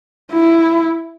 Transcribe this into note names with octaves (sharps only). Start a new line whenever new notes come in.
E4